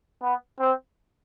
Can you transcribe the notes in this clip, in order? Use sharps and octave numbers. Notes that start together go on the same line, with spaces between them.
B3
C4